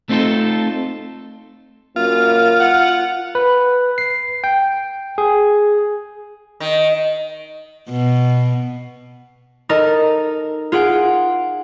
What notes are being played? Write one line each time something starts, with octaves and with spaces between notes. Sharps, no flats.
A3 C4 D#4 F4 A4
F#2 A#3 F4
F#5
B4
C7
G5
G#4
D#3
B2
D#4 A4 A#4 D#5
F4 G#4 F#5 D7